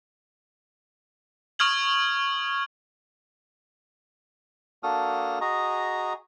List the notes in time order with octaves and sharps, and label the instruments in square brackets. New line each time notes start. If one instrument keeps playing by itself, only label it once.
[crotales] C#6 D#6 F6 G#6 F#7
[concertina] A#3 D4 F#4 A4 D#6 F6
F#4 G#4 D#5 A#5